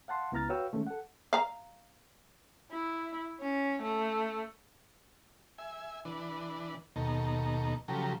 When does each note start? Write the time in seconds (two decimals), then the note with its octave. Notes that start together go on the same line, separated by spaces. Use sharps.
0.08 F5 F#5 A5 C6
0.32 C#2 B3 E4 A#5 F6 A6
0.49 F#4 B4 C#5 F5 G5 E6
0.73 D#3 G#3 A3 C#4
0.87 A4 F#5
1.33 F5 A#5
2.72 E4
3.41 C#4
3.82 A3
5.58 E5 G#5
6.05 E3 D4 B4
6.96 D#2 B2 D#4 A4 A#5
7.88 C#3 F3 F#3 G4 A4 A#5